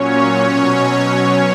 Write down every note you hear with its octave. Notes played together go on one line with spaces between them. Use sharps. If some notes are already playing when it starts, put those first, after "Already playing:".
Already playing: A#2 F#3 C#4 C#5
B2 F#3